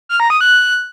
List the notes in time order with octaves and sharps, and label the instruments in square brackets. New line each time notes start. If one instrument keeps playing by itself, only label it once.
[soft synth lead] F6
A#5
D#6
F#6